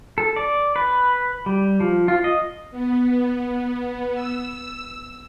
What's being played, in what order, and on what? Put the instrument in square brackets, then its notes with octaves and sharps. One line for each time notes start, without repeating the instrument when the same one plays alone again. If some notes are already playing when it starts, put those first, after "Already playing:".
[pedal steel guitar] A4
D5
B4
G3
F3
F4
D#5
[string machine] B3
E6